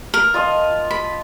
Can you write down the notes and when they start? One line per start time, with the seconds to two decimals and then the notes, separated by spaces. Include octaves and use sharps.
0.14 A#4
0.34 F4 D#5 A5
0.91 B5